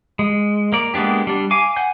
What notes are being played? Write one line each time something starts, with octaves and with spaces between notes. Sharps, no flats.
G#3
A#3 D5
G#3 A#3 B3 D4 G4
G3 D4
F5 G#5 D6
F#5 G#5 G6